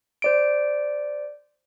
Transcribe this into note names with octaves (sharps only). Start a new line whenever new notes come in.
C5 D5 D7